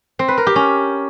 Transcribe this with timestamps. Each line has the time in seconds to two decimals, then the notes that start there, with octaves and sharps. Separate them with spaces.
0.19 C4
0.28 B4
0.37 A#4
0.47 G4
0.56 C#4